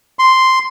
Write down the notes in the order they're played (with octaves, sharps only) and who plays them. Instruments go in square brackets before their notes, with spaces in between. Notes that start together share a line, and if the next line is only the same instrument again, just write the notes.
[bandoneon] C6